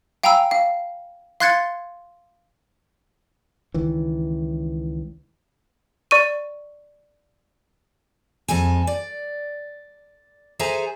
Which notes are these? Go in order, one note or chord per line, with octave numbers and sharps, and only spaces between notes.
F5 G5 G#5 A#5 B5 E6
F5
F5 C6 F#6 G#6 A6 C#7
C#2 D#3 E3
D5 C#6 D#7
F2 G#3 A4 G#5
D5
G#4 A4 C5 E5 G#5 A#5